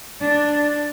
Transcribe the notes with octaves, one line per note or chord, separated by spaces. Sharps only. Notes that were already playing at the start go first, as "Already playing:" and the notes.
D4